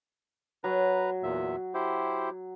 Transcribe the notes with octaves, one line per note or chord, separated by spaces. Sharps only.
F#3 B4 A#5
E2 A#2 E5
E4 G4 C5